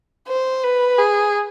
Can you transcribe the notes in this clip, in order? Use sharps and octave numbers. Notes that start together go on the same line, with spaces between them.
C5
B4
G#4